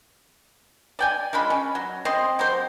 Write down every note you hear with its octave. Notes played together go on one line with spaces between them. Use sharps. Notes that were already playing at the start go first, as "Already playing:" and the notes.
D5 G5 G#5
G#3 D4 F4 B5
C#4
F#3
C4 D#5 C6
F#3 G4 C5